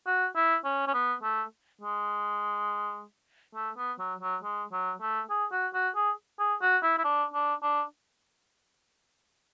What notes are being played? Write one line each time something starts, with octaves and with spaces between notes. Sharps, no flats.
F#4
E4
C#4
C#4
B3
A3
G#3
A3
B3
F#3
F#3
G#3
F#3
A3
G#4
F#4
F#4
G#4
G#4
F#4
E4
E4
D4
D4
D4